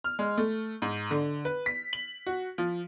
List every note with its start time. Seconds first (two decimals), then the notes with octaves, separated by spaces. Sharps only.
0.04 F6
0.19 G#3
0.38 A3
0.82 G#2
1.11 D3
1.45 B4
1.66 B6
1.93 F#7
2.27 F#4
2.58 F3